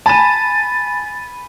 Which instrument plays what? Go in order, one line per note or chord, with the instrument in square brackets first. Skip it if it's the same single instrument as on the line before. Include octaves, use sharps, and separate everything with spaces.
[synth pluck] G#5 B5 D#7 [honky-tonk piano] A5 E7 [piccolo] A6